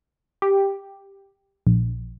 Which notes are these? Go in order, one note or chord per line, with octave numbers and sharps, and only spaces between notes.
G4
A#1